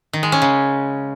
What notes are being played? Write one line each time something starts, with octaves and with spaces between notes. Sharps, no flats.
D#3
G#3
C#4
C#3